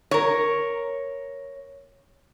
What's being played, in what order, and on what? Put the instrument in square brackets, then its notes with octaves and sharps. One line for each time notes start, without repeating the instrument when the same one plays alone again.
[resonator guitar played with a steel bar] A#4 C#5